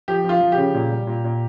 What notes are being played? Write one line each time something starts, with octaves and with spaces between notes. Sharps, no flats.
F3 G4
F3
F4
F3
G4
C#3
A#2
G3
A#2
A#2